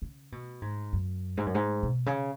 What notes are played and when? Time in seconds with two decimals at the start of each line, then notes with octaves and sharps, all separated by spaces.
0.02 C#3
0.32 B2
0.62 G#2
0.93 F#2
1.37 G#2
1.46 F#2
1.55 G#2
1.83 B2
2.06 C#3